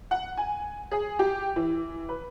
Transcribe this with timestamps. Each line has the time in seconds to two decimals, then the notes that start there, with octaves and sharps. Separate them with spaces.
0.11 F#5
0.37 G#5
0.91 G#4
1.19 G4
1.56 E3
2.09 B4